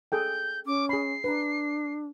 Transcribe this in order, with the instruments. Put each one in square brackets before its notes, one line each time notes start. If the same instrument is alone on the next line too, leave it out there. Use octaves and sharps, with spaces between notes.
[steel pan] G#4 A4 G5 [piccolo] G6
[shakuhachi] C#4 [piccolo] D6
[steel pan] G#4 B5 [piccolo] C7
[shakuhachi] D4 [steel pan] B4 A#5